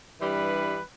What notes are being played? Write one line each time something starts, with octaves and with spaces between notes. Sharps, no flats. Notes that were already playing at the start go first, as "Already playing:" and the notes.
G2 E3 G3 B4